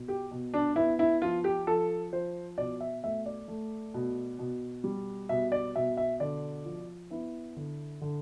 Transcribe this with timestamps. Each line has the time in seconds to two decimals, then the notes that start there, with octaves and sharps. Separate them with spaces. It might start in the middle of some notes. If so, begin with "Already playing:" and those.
Already playing: B2
0.08 G4
0.31 B2
0.54 D4
0.76 B3 E4
0.99 E4
1.22 F3 F4
1.44 G4
1.67 F3 A4
2.12 F3 C5
2.58 B2 D5
2.80 E5
3.04 A3 E5
3.26 D5
3.48 A3
3.94 B2
4.39 B2
4.84 G3
5.29 B2 E5
5.52 D5
5.75 B2 E5
5.97 E5
6.20 D3 D5
6.65 F3
7.10 B3 E4
7.56 D3
8.01 D3